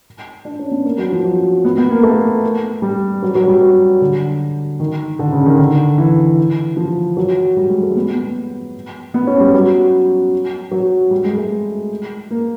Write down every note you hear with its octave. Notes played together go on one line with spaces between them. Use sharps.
D4
C#4
B3
A#3
F#3
F3
F#3
B3
B3
A#3
A3
G3
F#3
F#3
G3
F#3
D3
D#3
D3
C#3
D#3
D3
E3
F3
F#3
G3
G#3
A3
B3
B3
B3
C#4
G3
F#3
F#3
G3
G#3
A3
A#3